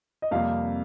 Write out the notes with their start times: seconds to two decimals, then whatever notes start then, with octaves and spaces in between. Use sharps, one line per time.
0.22 D#5
0.31 F2 C3 G3 A#3 F5